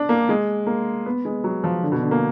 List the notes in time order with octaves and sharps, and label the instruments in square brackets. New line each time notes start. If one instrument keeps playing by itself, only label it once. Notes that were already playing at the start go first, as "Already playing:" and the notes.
Already playing: [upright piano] D4
A#3
G#3
A#3
B3
G#3
F#3
F3
D3
B2
D3
A#3